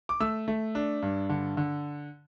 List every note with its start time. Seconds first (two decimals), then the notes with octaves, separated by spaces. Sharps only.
0.09 D6
0.20 A3 E6
0.48 A3
0.75 D4
1.02 G2
1.29 D3
1.57 D3